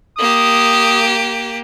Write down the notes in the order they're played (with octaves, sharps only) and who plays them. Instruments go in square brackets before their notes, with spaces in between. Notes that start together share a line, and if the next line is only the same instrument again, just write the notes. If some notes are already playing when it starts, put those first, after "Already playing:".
[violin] A#3 G4 [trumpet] D#6